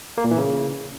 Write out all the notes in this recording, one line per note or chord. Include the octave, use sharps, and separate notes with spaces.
A#3
A#2
E3
C#3